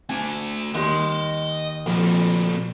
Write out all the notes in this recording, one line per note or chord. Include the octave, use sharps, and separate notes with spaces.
A3 D4 G#5
D#2 D#5 C6
F2 A#2 B3